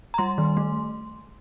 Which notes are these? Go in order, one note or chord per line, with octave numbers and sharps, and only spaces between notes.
A#5
G3 C6
D#3
A3